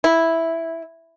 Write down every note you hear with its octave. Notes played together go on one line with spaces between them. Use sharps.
E4